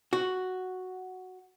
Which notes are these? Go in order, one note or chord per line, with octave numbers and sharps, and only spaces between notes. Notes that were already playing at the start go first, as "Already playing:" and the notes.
F#4